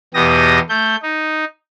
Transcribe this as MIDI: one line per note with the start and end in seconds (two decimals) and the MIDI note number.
0.14 0.59 40
0.14 0.59 47
0.14 0.59 67
0.14 0.59 87
0.14 0.59 94
0.69 0.96 57
0.69 0.96 91
1.02 1.44 63